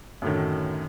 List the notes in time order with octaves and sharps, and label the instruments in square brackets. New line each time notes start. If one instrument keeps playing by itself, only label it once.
[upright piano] F#2 A2 D3 D#3